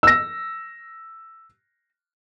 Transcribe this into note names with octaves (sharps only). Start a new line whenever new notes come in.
E6 A#6